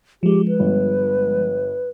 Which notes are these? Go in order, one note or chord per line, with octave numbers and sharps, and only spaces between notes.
F3 G#3 G4
B4
G1